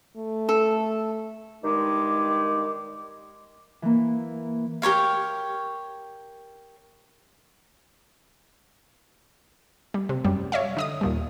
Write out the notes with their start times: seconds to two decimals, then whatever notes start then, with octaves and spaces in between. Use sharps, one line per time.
0.17 A3
0.49 A4
1.64 G2 D#3 G#3 D#4 D6
3.82 E3 A#3
4.82 G4 A#4 C#5 F5
9.94 G3
10.09 C3
10.25 F#2 G3
10.52 C#5 D5 E5 F5
10.77 D3 D#5 D#6
11.01 D#2 A#2 G3